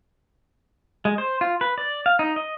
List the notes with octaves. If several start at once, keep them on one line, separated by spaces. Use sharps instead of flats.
G#3
C5
F4
B4
D5
F5
D#4
D#5